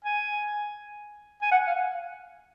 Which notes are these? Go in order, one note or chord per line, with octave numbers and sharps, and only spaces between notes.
G#5
G#5
F#5
F5